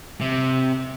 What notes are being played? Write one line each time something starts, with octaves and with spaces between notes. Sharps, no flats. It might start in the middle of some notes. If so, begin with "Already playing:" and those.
C3